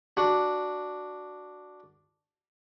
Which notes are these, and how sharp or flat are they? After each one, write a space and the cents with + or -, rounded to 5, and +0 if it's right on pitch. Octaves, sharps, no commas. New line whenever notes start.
D4 +0 F#4 +0